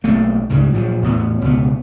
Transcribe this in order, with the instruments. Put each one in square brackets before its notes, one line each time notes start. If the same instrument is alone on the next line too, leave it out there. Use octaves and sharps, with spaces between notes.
[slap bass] B1 A3 A#3
C#2 G#2 C#3 G3
A#2 F3 F#3
E2 A2 B3
C#2 B2 B3